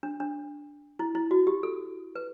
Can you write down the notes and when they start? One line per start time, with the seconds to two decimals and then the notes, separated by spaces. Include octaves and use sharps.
0.03 D4
0.20 D4
0.99 E4
1.15 E4
1.31 F#4
1.47 G4
1.63 A4
2.15 B4